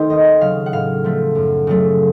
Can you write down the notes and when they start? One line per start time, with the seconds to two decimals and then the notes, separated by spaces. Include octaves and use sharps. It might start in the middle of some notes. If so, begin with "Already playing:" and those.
Already playing: D#3 A3 C4 D#4 C5
0.10 D#2 D#5
0.41 C#3 F#3 F5
0.66 F#5
0.72 A2 F5
1.04 F3 A3
1.35 F#2
1.67 C#3 F#3 A3